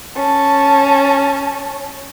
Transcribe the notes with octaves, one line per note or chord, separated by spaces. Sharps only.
C#4 A5